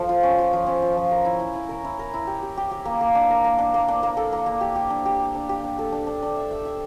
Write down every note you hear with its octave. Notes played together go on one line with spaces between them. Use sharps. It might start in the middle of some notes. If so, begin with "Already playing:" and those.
Already playing: F3 A4
F4
C#4
F4
F3
C#4
F3
F3
A#4
E4
E4
E4
A#4
E4
A#4
E4
G4
G4
G4
G4
A#3
A#3
D4
A#4
A#3
D4
A#3
D4
A#3
A4
A#3
A#3
G4
G4
D4
G4
G4
D4
G4
D4
A4
D4
D4
D4
E5
E5
E5